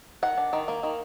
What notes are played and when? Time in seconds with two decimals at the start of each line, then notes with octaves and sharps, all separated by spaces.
0.23 D#3 F#5
0.38 D4
0.53 D#3
0.68 A#3
0.83 D#3